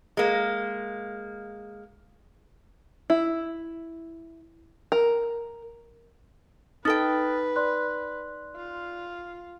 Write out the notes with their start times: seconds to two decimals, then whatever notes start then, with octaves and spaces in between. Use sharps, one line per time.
0.17 G#3 A#3
3.10 E4
4.92 A#4
6.85 D#4 A4 B4 G5 D#6 F6 A6
7.56 D5 C6 F#6
8.56 F4